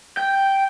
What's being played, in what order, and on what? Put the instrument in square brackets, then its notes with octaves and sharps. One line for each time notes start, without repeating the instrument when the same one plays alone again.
[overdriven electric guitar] G5